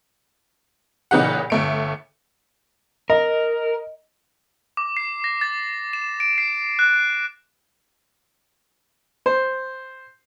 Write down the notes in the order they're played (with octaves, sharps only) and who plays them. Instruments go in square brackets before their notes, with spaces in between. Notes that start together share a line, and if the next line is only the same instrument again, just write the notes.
[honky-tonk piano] A#2 C#3 E3 D#4 G4 F#5
G1 A3 D7
[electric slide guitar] A#4 [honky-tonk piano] D#5
[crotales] D6
C7
A#6
A6
E7
D7
C7
F#6
[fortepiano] C5